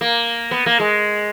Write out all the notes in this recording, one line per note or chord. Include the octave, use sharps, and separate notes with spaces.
A#3
B3
A#3
G#3